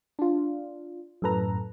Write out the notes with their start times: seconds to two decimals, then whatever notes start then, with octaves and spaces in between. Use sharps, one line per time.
0.19 D4 F4
1.22 F#2 A2 A4 B4 A#5